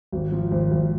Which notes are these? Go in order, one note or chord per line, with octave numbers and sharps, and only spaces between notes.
G#1
F3
G#1
G#1